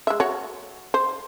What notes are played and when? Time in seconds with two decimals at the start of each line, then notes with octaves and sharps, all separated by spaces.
0.07 G#3 E5
0.20 F#4 C#5
0.94 C5